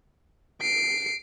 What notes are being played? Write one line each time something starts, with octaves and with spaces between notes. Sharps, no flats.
C7 D7